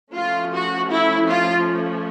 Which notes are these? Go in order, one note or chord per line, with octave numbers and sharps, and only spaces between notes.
F3 A3 C#4 F4
F#4
E4
F4